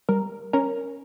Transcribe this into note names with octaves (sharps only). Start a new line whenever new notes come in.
G3 A#4
C#4 A#4